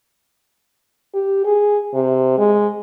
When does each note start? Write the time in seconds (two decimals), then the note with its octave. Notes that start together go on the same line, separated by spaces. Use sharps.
1.14 G4
1.45 G#4
1.94 C3
2.39 G#3